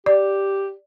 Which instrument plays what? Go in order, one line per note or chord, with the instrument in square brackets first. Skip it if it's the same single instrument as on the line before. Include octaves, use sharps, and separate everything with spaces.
[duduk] G4 [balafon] D5